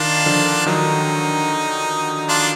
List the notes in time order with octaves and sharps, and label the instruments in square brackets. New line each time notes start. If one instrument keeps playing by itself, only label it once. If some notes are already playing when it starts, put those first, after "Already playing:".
Already playing: [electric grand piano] D#3 [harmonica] D4 F4
[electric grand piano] D3 F3
[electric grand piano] D#3 F#3 [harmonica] D#4
[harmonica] D4 F4